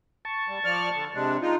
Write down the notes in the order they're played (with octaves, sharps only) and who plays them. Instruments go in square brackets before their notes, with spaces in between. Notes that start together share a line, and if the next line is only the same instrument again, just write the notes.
[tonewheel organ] A5 C#6
[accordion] G3
F3 D5 F6
D3
C3 G#3 D4
G#3 D#4 F4